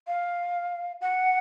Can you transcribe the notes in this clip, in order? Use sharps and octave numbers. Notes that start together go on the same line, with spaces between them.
F5
F#5